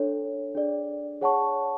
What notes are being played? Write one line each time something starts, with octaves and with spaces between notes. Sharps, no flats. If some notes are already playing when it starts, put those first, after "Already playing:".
Already playing: D4 A4 C#5
D4 G#4 D5
G#4 C#5 F#5 A5 C#6